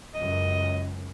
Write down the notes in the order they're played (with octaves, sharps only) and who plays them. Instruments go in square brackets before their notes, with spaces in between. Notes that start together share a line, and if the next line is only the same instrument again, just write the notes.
[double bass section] C#2 F#2 [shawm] D#5